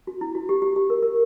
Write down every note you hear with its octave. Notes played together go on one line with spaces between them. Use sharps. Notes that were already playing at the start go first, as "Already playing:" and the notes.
F#4
E4
F#4
G4
G4
G4
A#4
A#4